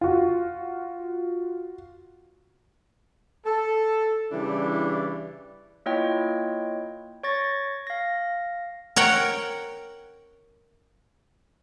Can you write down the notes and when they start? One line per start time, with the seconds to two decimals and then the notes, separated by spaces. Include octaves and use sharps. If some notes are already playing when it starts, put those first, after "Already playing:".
0.01 F4 F#4
3.46 A4
4.32 C#3 E3 G3 D4 E4 D5
5.86 A#3 E4 F4 C#5 D#5 G5
7.23 C#5 C#6 A6 A#6
7.87 F5 A#6
8.96 A#4 C#5 F#5 G5